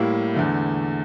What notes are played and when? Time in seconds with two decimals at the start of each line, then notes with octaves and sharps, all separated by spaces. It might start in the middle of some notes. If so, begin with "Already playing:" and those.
Already playing: A2 G3 A#3 E4
0.34 E2 D3 A3